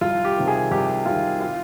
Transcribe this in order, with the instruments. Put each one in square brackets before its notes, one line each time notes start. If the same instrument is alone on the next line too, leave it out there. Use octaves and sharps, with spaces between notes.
[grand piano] C2 F4
G4
C3 D#3
G#4
C2 G4
C3 D#3 F4
F4